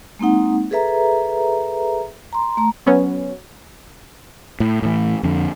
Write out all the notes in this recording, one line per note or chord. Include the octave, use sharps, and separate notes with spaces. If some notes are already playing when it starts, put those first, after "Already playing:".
G#3 A#3 C4 D#4 F#5
G#4 A4 B4 E5 A#5
A#5 C6
A3 A#5
F#3 B3 C#4
A2
A2 E3
F2 D3